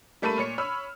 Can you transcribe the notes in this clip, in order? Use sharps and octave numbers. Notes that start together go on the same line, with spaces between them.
G3 A3 A#3 A4 B5 D#7
A#2 C#5 C#7
C#5 B5 E6 F6